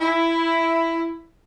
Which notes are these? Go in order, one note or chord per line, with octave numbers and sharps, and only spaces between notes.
E4